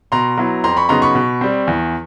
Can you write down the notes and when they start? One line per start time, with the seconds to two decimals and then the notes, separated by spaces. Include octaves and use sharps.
0.12 B2 A#5 C6
0.38 F#3 B3 E4
0.64 F2 A#5 C6
0.77 B5 C#6
0.89 C#3 F#3 B3 D#4 A#5 C6
1.02 B5 C#6
1.15 B2
1.41 G3 C4
1.67 E2